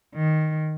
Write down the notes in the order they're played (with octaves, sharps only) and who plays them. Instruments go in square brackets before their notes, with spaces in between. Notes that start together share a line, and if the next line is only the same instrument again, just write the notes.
[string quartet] D#3